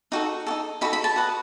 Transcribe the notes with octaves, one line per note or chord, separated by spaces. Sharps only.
D#4 F#4 A4
D#4 F#4 A4
D#4 F#4 A4 B5
B5
A5
F#4 B4 D#5